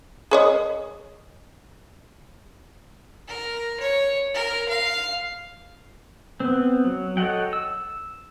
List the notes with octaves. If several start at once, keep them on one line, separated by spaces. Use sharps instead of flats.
G#4 C#5 D#5
A#4
C#5
A#4
F5
B3 C4
F#3
A4 C#5 D#5 F#5 G5
E6